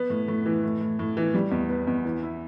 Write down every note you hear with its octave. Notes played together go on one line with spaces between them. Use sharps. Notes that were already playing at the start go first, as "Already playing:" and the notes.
Already playing: B3
A2
A2
E3
A2
A2
A2
E3
G3
E2
B3
E2
E3
E4